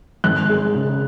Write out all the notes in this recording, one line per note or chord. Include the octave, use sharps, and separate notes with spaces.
G#1 F#6
G#3
C#3